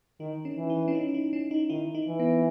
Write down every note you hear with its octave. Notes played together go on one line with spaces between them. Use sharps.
D#3 D#4
C#4
E3
E4
C#4
D#4
D#4
C#4
D#4
D#3 E4
D#4
E3
B3